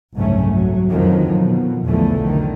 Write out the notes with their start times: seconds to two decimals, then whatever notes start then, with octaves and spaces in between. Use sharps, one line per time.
0.15 F#1 C2 G#2 G3 A3 C#4
0.51 F#3
0.90 F2 G#2 D3 D#3 F3 F#3
1.39 B2
1.85 B1 E2 D3 E3 F3 A3
2.24 D3 D#3